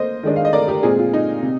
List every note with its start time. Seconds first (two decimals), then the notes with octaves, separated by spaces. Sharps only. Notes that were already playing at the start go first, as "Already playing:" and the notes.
Already playing: A#3 C5 D#5
0.23 D#3 G#3 D4
0.36 F5
0.45 D#5
0.53 A#4 D5
0.68 G4 A#4
0.83 A#2 G#3 C4 F4 G#4
0.99 F4
1.14 D#4
1.43 C3